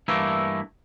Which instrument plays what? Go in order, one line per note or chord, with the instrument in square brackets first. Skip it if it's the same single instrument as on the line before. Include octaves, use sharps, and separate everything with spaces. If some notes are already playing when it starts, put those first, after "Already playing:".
[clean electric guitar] G2 E3 A3 A#3 E4